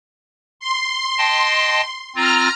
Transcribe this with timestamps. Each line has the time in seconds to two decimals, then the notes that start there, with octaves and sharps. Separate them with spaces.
0.60 C6
1.18 D#5 G5 A5
2.15 C4 F4 A#5 F6